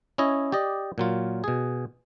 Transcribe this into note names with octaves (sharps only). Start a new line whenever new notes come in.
C#4 E4 C#5 D#5
G4 D5 D#5
A#2 F#3 F4
B2 G#4